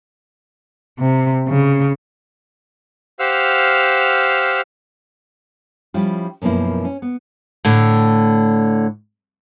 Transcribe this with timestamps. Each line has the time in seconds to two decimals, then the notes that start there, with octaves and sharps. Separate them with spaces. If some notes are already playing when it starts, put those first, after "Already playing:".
0.99 C3
1.48 C#3
3.19 G4 C5 F5 F#5 E6 F6
5.94 F3 G3 C#4 E4 F4
6.42 F#2 B2 F3 A#3 E4
6.85 C#4
7.02 B3
7.65 A2 D3